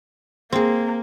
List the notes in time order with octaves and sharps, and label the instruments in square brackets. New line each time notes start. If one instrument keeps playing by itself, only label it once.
[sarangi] A#3 [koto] C4 G#4